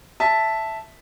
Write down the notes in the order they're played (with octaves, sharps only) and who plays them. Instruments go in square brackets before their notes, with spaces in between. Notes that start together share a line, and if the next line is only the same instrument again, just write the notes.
[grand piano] E5 A5